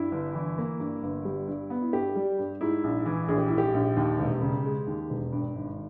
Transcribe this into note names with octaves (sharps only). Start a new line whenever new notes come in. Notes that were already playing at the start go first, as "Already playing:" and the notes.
Already playing: G2 E4
G1
E3
A#3
G2
G1
G3
G2
B3
E4
G2 G4
G3
G2
G#2 E4
A#1
E3
A#1 G#4
G4
G#2 E4
G4
A#1
D#2
E1
C#3
G#3
D#2
E1
G2
G#1